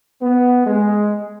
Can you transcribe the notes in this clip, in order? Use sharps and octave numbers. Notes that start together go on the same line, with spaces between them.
B3
G#3